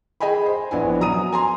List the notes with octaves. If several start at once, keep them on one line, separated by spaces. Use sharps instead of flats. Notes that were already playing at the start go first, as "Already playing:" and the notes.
G#4 D#5 G5 G#5 B5
C5
A#1 B3 D4 E4 G#5
F#3 A#5 D#6 D#7
G#5 A#5 C6